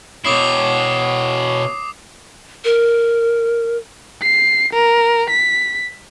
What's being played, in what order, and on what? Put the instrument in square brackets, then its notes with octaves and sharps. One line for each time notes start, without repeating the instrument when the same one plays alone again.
[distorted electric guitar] B2 E4 [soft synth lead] C#5 [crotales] D6 D#6 C7
[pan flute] A#4
[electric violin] C7
A#4
B6